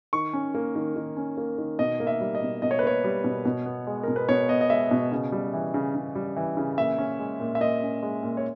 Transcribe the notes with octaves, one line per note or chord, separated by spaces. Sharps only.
D#3 C#6
C#4
A#3
D#3
D#3
C#4
A#3
D#3
B2 D#5
A#3
E5
G3
D#5
B2
B2 D#5
C#5
B4
A#3 C#5
G3
B2
B2
B3
G#3
B2 A#4
B4
B2 C#5
B3 D#5
D#5
G#3 E5
B2
C#3
G3
E3
C#3
C#3
G3
E3
C#3
A#2 E5
C#4
G#3
A#2
E5
A#2 D#5
C#4
G#3
A#2
C#5